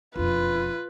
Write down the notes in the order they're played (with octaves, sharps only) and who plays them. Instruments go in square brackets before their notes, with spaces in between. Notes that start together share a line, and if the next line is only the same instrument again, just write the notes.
[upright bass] E1 F2 [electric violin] F4 [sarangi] B4